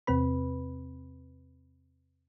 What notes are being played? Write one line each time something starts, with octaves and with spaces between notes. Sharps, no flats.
E2 C3 C4 B4 B5